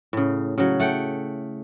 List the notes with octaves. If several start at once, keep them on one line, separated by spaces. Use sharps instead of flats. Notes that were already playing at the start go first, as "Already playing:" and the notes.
A2 C#3
C#3 F#3
A3 F#5 G5